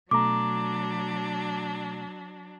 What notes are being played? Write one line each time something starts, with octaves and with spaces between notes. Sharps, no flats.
B2 F#3 A3 D4 A#5 D6